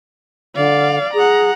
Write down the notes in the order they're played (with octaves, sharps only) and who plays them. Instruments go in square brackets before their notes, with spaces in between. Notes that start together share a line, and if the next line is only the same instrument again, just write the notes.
[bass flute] D3 [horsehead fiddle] D5 F5
[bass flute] G#4 [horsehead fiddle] F#5 A#5